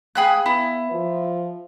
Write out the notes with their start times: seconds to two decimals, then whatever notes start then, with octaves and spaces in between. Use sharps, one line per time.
0.15 G#4 F5 G5 G#5 B5 F#6
0.46 B3 E4
0.91 F3